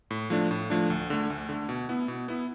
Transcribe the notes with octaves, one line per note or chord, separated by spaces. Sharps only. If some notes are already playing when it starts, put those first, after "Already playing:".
A2
F3 A3 D4
A2
F3 A3 D4
D2
D3 A3
D2
D3 A3
B2
B3 E4
B2
B3 E4